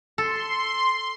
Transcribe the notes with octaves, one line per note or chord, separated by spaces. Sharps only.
A4 C6